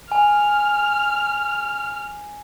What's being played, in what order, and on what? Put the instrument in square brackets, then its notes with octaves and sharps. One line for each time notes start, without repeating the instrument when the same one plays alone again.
[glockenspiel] G#5 [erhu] F6